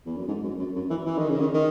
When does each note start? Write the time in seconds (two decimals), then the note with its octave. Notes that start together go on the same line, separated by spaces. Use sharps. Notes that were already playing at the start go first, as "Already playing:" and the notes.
0.06 E2
0.17 F#2
0.28 G#2
0.44 F#2
0.59 F#2
0.76 F#2
0.91 E3
1.06 E3
1.18 D#3
1.29 C#3
1.41 D#3
1.54 D#3